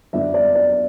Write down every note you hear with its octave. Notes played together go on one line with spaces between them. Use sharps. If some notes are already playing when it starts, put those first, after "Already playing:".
F#2 D3 F#3 B3 D4 E5
D5
D5